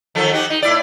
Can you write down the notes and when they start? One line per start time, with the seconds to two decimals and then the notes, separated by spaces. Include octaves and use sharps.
0.15 D#3 F3 A4
0.33 D#4 F#4 G4
0.50 D#4
0.63 A2 E4 D5